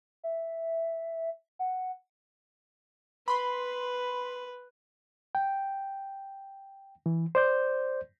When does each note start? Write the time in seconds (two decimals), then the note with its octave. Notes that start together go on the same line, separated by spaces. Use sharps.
0.24 E5
1.59 F#5
3.28 B4 B5 C6
5.35 G5
7.06 E3
7.35 C5 D5 G6